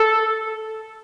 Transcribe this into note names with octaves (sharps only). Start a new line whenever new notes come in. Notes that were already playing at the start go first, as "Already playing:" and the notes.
Already playing: A4